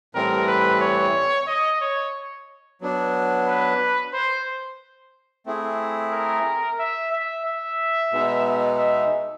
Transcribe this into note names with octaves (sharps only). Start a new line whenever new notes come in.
A2 E3 G3 C4 A#4
B4
C#5
D#5
C#5
F#3 B3 D4
B4
C5
A3 C4 E4 G#4
A#4
E5
E5
E5
B2 G#3 B3 D#4
E5